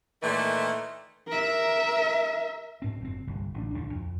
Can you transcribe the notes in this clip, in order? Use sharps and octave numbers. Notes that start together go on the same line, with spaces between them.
A#2 D#3 E3 A3
A#4 E5
G#2 C4
F#1 C4
G1 C2
A1 C4 D4
D#1 C2 D3 D4
F2